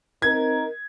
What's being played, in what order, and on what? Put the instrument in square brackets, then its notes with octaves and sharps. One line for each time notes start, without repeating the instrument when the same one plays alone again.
[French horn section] C4 D#4 A#4 [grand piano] G#6